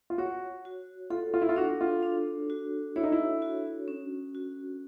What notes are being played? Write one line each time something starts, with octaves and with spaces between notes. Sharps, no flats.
F4
F#4 C#5
F#4
F4 A4
F4
E4
F4
D4 F#4
F4
D4
F#4
E4 C#5
D#4
E4
F#4
C#4
F#4